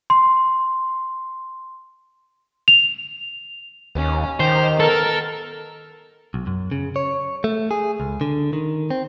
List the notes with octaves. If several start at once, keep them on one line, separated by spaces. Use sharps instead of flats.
C6
F7
D#2 C#4
D#3 G4 C5 F7
B3 A4 A#4 A6
B1
F#2
C#3
C#5
A3
G#4
C#2
D3
D#3
C4